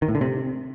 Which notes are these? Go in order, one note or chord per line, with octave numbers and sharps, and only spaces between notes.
D#3
A2
D3
C3